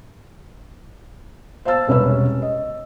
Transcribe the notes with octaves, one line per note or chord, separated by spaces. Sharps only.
C5 F5 A5 E6 A6
E1 C2 C#4 B4 C#5 E6
D#5